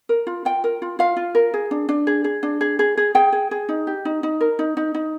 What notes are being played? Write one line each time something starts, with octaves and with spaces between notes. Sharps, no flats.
A#4
F4
F4 G5
A#4
F4
F4 F5
F4
A#4
G#4
D4
D4
G#4
G#4
D4
G#4
G#4
G#4
G#4 G5
G#4
G#4
D#4
G4
D#4
D#4
A#4
D#4
D#4
D#4